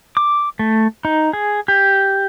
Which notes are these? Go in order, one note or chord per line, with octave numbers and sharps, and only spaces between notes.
D6
A3
D#4
G#4
G4